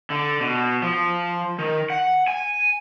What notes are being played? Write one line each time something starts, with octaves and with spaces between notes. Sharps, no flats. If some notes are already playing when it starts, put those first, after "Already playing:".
D3
B2
F3
D#3
F#5
G#5